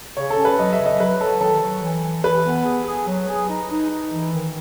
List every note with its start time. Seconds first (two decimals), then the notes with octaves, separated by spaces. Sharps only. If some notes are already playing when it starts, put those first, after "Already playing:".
0.17 C#3 C#5
0.30 A4
0.37 C#4
0.45 B4
0.59 F#3 D#5
0.72 E5
0.79 C#3
0.86 D#5
1.00 F#3 B4
1.20 F#3 A4
1.41 D#3 A4
1.62 F#3
1.83 E3
2.04 E3
2.24 E3 B4
2.45 B3
2.65 G#4
2.87 G#4
3.07 F#3
3.29 G#4
3.48 D#4
3.70 D#4
3.90 D#4
4.12 E3
4.32 D#3